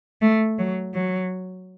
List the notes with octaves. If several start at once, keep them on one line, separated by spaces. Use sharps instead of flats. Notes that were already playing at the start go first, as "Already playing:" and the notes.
A3
F#3
F#3